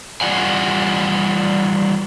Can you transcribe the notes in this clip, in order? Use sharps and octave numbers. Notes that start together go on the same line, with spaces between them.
E3 G3 F4 D5 F#5 G#5